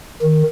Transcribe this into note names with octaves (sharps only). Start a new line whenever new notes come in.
D#3